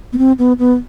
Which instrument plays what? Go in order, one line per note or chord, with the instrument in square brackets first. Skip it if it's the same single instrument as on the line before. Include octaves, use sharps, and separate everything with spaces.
[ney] B3
C4
B3
B3